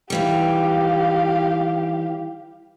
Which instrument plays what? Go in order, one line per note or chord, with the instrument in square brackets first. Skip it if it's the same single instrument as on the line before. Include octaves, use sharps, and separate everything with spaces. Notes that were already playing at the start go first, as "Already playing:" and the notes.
[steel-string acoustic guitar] D#3 E3 G3 [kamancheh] G4 F5